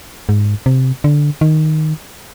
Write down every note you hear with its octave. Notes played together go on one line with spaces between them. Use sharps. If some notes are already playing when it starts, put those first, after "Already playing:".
G#2
C3
D3
D#3